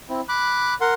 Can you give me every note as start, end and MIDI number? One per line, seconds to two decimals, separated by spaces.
0.09 0.21 60
0.09 0.21 64
0.29 0.74 83
0.29 0.74 86
0.29 0.74 90
0.81 0.94 70
0.81 0.94 78
0.81 0.94 84